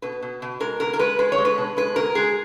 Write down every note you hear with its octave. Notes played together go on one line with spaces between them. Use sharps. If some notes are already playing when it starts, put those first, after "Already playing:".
B2 B4
B2
B2
G#3 A#4
B2 A#4
A#4
G#3 B4
G#3 B4
C#5
G#3
B4
B2
G#3 B4
B2 A#4
G#3 G#4